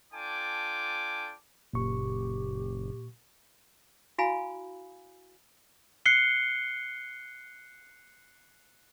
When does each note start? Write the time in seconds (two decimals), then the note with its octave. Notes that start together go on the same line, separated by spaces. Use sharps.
0.13 D4 F4 A4 G5 G#5 D6
1.73 F#1 A#2 G4 C#6
4.18 E4 F#4 F5 G#5 B5
6.06 F#6 C7 C#7 G7